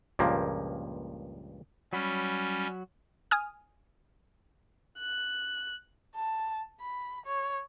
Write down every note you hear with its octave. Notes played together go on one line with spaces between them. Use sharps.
C#2 G2 A#2 F3 A#3
F#3 G3 C#4 F#4 B5
G#5 D#6 F6
F#6
A5
B5
C#5